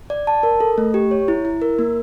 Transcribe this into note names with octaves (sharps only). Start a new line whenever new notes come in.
D5
A5
A#4
A4
A3
G4
C#5
E4
E4
A#4
A#3